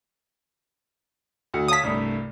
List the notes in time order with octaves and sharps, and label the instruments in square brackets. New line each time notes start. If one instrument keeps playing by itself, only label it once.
[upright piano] D2 F#4 C#7
[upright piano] C#5 F5 A5 [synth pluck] D#6 B6
[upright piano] C2 G2 A3